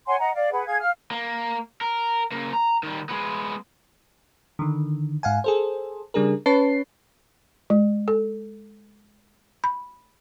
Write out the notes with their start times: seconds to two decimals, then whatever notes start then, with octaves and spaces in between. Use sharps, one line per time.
0.07 C#5 F#5 G#5 C6
0.19 D#5 F#5 A#5
0.34 D5 F5
0.52 G#4 B4 F#5
0.66 G#4 F5 G#6
0.80 F5 F6
1.11 A#3
1.81 A#4
2.32 C#3 A#3
2.53 A#5
2.83 D#3 G3
3.09 G#3 B3
4.59 D3 D#3
5.23 G#2 F5 F#5 G#5
5.44 G#4 A4 C5
6.14 C#3 G3 D4 G#4 A#4
6.46 C#4 B4 C#5 A5 C7
7.70 G#3
8.08 A4
9.64 B5